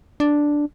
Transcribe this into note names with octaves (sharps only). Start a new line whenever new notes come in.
D4